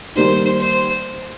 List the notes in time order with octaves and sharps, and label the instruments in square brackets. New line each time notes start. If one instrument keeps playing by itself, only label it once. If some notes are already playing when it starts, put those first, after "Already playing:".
[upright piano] D#3 G3 A#3 D#4 [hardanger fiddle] C5
[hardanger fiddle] C5